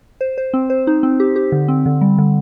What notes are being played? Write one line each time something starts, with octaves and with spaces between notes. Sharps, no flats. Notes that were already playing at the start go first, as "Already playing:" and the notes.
C5
C5
C4
C5
D#4
C4
G4
G4
D3
C4
D3
G3
D3